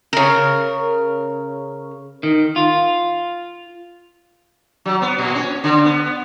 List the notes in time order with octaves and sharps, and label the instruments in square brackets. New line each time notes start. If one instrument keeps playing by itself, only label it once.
[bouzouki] C#3 A#4
[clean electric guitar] D#3
F4
[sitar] F#3
B3
A#2
C#4
D3
B3